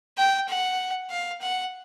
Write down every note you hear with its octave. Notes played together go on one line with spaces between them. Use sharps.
G5
F#5
F5
F#5